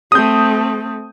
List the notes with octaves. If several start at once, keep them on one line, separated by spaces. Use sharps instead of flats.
A3 C4 D#6 G6